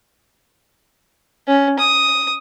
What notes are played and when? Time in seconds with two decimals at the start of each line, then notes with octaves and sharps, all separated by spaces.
1.47 C#4
1.79 D#6